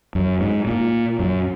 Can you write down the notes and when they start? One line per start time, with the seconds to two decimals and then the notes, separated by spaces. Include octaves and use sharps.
0.15 F#2
0.41 G#2
0.67 A#2
1.19 F#2